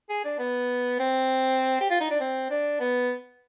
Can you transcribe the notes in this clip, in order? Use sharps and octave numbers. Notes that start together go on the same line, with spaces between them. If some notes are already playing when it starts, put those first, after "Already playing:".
G#4
D4
B3
C4
G4
F4
D#4
D4
C4
D4
B3